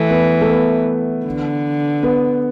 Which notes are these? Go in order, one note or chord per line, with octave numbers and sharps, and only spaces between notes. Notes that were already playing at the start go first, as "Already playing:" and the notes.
Already playing: E3 A3
B3
A3
B3
D3
B3